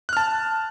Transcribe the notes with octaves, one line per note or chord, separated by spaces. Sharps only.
A5 F6 F#6